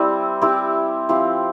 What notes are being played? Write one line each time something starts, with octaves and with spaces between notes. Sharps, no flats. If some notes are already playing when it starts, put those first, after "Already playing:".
Already playing: G3 C4 E4 G4
C4 E4 G4
F3 C4 E4 G4